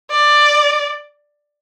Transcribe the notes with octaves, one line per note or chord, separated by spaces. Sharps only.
D5